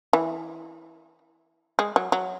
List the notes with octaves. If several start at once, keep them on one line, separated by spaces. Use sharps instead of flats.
E3
G#3
F#3
F#3